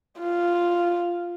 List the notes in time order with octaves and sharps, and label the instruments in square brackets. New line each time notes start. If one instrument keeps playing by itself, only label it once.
[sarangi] F4